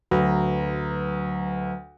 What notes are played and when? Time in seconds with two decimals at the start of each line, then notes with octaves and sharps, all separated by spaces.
0.11 D2 F#3 B4 A#5